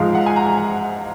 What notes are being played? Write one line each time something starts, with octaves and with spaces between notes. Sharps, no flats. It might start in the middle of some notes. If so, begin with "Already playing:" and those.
Already playing: G#2 F3 G#3 F5
F#5
G#5
A#5
G#5
F#5